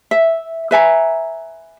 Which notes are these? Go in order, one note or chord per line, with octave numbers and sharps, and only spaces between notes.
E5
B4 E5 G#5 A#5